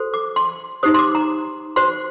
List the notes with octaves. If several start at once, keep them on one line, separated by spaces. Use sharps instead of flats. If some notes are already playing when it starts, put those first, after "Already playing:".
Already playing: F#4 A4 C5
D6
C6
D#4 G4 C5 D#6
C6
D6
A#5
F#4 C5 C6